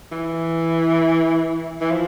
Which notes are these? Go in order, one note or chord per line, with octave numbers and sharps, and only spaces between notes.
E3
E3
F3